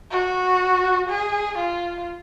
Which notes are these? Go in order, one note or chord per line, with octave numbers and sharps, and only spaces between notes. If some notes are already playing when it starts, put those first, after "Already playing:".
F#4
G#4
F4